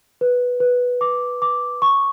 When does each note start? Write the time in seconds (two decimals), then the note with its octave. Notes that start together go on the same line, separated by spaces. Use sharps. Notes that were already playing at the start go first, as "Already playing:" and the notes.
0.21 B4
0.60 B4
1.01 D6
1.42 D6
1.82 C#6